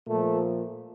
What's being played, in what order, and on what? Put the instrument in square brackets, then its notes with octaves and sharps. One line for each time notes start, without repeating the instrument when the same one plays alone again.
[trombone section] A#2 F3 A3